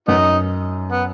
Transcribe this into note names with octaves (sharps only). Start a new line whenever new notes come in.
F#2 B3 D#4
B3